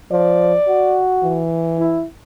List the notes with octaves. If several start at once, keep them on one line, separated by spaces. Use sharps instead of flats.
F3 D5
F#4
E3
E4